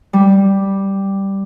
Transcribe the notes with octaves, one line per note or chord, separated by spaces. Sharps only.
G3